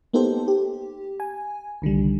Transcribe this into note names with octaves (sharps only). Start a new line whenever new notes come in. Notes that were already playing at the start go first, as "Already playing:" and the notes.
A#3 B3 D#4 G4 A4 C5
G4
G#5
C2 D3 D#3 G3